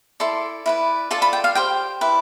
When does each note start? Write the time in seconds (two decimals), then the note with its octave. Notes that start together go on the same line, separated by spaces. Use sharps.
0.20 E4 A4 D5 C6
0.66 E4 B4 D5
1.11 F4 A4 D5 A5
1.22 B5
1.33 G5
1.44 F5
1.55 G4 C5 G5
2.01 E4 B4 D5